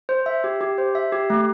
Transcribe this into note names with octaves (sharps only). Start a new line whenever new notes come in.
C5
E5
G4
G4
C5
E5
G4
A3